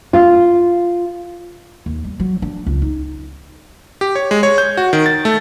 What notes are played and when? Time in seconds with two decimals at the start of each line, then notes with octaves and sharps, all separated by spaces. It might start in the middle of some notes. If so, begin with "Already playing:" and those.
0.13 F4
1.86 D#2
2.04 G3
2.20 F#3
2.42 D4
2.67 C#2
2.82 D#4
4.01 G4
4.15 C#5
4.31 G#3
4.43 C#5
4.58 G6
4.77 F#4
4.93 D#3
5.06 A6
5.25 A3